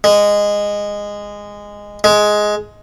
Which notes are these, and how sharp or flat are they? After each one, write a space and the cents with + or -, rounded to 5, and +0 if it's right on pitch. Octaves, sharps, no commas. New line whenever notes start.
G#3 -15
G#3 +10